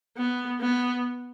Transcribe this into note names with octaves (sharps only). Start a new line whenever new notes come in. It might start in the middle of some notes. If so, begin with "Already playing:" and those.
B3
B3